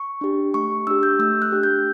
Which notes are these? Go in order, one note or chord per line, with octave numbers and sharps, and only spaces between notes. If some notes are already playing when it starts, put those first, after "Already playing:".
Already playing: C#6
D4 G4
A3 C#6
D4 G4 E6
G6
A3 E6
F#6
D4 G4
G6